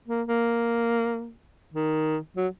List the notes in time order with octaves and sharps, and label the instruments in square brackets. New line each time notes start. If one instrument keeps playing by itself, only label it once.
[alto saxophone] A#3
A#3
D#3
F#3